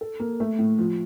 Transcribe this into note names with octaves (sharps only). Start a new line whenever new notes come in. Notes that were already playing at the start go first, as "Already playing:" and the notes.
A4
A#3
A3
A2
F3